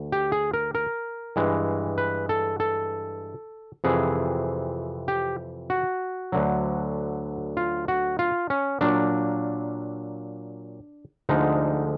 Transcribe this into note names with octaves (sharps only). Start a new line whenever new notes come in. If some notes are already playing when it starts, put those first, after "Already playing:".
Already playing: D2
G4
G#4
A#4
A#4
G2 E3 G#3
B4
A4
A4
F2 C3 E3 G#4
G4
F#4
D2 D3 F#3
F4
F#4
F4
C#4
A#2 F#3 A#3 D4
D2 D3 F3 G#3 D#4